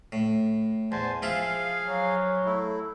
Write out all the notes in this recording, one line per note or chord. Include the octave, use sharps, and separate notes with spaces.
A2
E2 C5 G#5 A5
F3 E4 F4 G#4 F5
F#3
A3 E4